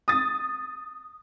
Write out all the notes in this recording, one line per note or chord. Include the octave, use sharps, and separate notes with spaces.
D#6 A6